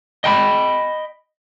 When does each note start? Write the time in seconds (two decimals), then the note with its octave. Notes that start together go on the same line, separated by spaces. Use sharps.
0.24 D#5 G5 A#5 B5